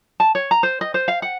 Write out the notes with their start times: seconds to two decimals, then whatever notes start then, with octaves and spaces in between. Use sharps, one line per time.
0.20 A5
0.35 C#5
0.51 A#5
0.63 C5
0.81 D#5
0.94 C5
1.08 F5
1.22 F#5